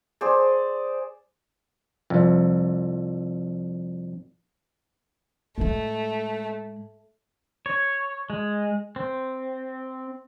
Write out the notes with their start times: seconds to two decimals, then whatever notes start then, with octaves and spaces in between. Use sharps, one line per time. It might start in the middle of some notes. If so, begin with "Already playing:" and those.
0.21 G#4 C5 D5
2.10 C2 F2
5.58 A2 G#3 A3
7.66 C#5
8.30 G#3
8.96 C4